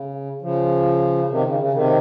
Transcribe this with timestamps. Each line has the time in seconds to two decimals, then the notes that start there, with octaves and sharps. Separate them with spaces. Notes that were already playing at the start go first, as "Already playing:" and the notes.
Already playing: C#3
0.42 C#3 F3
1.30 C3 D#3
1.45 C#3
1.59 C#3
1.74 C3 D#3